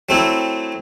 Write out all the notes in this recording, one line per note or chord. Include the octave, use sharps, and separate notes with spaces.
F#3 A3 C4 E4